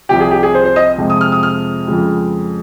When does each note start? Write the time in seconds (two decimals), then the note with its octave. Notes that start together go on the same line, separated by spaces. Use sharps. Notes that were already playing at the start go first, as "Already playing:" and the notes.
0.09 C2 C3 F3 G4
0.20 G#4
0.31 G4
0.43 G#4
0.54 C5
0.65 C5
0.76 D#5
0.98 F2 C3 F3 G#3
1.10 D#6
1.21 F6
1.32 D#6
1.43 F6
1.87 F2 C#3 G#3